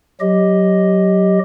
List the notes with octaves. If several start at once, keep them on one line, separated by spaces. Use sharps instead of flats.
F#3 G4 D#5